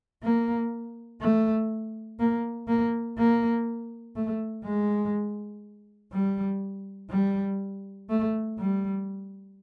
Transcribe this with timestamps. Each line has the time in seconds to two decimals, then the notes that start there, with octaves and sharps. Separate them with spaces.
0.23 A#3
1.21 A3
2.20 A#3
2.68 A#3
3.18 A#3
4.16 A3
4.64 G#3
6.12 G3
7.10 G3
8.09 A3
8.59 G3